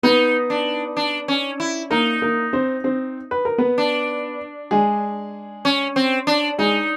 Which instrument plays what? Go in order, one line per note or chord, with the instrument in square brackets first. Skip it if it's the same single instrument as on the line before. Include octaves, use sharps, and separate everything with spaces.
[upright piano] B3 B4 [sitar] D#4
[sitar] D4
D4
C#4
E4
[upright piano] A#3 A#4 [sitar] D#4
[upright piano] A#3 A#4
C4 C5
C4 C5
B4
A#4
B3 B4
[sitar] D4
[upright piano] G#3 G#4
[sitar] C#4
C4
D4
[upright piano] G#3 G#4 [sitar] D#4